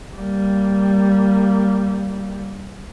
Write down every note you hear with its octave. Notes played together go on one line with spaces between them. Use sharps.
G3 A#3